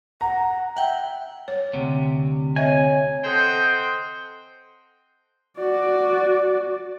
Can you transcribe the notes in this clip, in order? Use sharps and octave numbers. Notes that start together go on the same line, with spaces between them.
F#5 A#5
E5 F#5 G5
C#5
D2 C3
C4 C#5 D#5 E5 G#5
C4 A4 C5 D#5 F#5 G5
F#4 D5